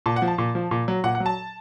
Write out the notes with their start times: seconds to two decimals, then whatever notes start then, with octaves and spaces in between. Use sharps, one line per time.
0.06 A#2 A5
0.16 F#5
0.22 F3
0.27 A5
0.38 A#2
0.55 F3
0.71 A#2
0.88 F#3
1.04 A#2 F#5
1.15 F#5
1.20 F#3
1.26 A5